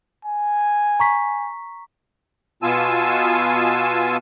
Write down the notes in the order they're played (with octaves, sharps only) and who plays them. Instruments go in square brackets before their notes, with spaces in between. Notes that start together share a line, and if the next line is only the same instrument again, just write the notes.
[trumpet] G#5
[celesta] A#5 C#6 B6
[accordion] B2 B3 F4 G#5 A5 E6